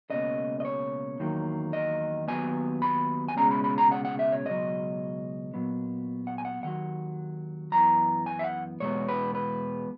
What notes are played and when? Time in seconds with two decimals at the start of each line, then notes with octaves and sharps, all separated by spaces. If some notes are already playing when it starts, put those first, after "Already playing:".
0.10 C#2 B2 A#3 C#4 D#5
0.60 D#5
0.65 C#5
1.20 E2 D#3 F#3 A#3
1.73 D#5
2.28 D#2 D#3 F#3 B3 G#5
2.82 B5
3.28 G#5
3.37 C#2 B2 G#3 C#4 A#5
3.51 B5
3.64 B5
3.78 A#5
3.91 F#5
4.05 F#5
4.19 E5
4.32 C#5
4.46 C#2 B2 F#3 D#5
5.54 A#2 F#3 B3
6.27 F#5
6.38 G#5
6.45 F#5
6.63 D#2 D#3 F#3 F#5
7.72 F#2 E3 B3 A#5
8.26 G#5
8.39 E5
8.44 F#5
8.80 E2 B2 G#3 B3 C#5
9.08 B4
9.35 B4